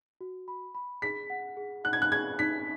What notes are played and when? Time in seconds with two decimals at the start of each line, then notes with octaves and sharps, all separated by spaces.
0.21 F#4
0.48 B5
0.75 B5
1.02 G#4 B6
1.30 F#5
1.57 G#4
1.84 F#5 F#6
1.93 G#6
2.02 F#6
2.12 G#4 G#6
2.39 D#4 B6